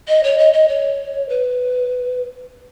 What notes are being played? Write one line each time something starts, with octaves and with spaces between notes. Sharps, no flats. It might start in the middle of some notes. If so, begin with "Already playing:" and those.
D#5
C#5
D#5
D#5
C#5
B4